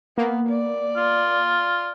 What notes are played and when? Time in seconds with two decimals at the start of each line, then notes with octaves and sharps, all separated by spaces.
0.18 A#3 B3
0.49 D5
0.97 F4